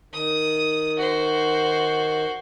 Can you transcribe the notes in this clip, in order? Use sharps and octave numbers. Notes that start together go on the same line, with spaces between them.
D#3 D#6
F#4 C5